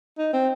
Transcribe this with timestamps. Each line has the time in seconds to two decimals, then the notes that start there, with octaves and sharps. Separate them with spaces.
0.18 D#4
0.33 C4